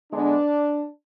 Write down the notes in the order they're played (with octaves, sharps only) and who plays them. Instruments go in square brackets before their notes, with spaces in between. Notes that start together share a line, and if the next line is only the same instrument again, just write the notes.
[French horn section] D3 G#3 B3 D4